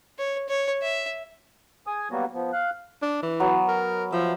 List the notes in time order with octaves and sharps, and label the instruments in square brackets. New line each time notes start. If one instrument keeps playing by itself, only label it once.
[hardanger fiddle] C#5
C#5
E5
[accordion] G#4 G#5 D#6
F#3 G3 A#3 B3 F#4
F3 B3
F5 F#6
[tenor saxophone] D4
E3
[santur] F#3 B3
[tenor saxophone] A#4
[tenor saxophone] F3 [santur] E5